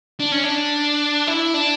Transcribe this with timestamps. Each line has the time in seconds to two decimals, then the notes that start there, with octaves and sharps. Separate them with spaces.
0.20 D4
0.32 C#4
0.44 D4
1.27 E4
1.54 D4